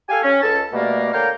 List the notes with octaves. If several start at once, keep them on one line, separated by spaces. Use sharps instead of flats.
G4 A4 F5 G#5
C#4
C#2 A4 A5
B2 G3 A3 A#3
D3 A#3 C#5 F5 G5 A#5